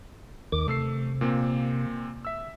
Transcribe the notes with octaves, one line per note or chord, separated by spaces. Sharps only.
D#2 D#3 D6
C3 A3 E6 C7
A#2 A#3 C4
E5 E6